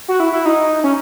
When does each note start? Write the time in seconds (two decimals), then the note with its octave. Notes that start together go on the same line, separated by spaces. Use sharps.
0.08 F#4
0.20 E4
0.33 E4
0.46 D#4
0.84 C#4